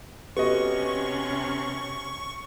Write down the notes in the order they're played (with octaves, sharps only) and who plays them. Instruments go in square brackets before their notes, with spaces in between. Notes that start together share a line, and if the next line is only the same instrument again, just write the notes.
[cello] C3 C#4 [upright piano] B3 D#5 [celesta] F#4 G4 A4 [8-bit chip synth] C#6